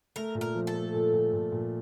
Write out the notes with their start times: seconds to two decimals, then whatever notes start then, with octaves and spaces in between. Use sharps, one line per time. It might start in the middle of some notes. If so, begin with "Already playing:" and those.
0.16 A3 A#4
0.35 A#2
0.41 A#4
0.55 F3
0.67 A4
0.75 A3
0.94 A#2
1.13 A#2
1.33 A#2
1.52 A#2